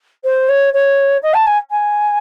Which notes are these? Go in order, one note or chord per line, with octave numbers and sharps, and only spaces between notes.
C5
C#5
C#5
D#5
A5
G#5
G#5